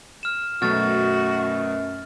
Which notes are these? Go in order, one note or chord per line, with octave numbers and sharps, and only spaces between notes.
F6 E7
F#2 B2 F#3 A3 F#4 F6 A6